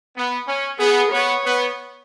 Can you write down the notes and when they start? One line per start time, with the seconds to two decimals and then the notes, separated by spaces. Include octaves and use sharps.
0.15 B3
0.47 C#4
0.79 B3 G#4
1.11 B3 C#5
1.43 B3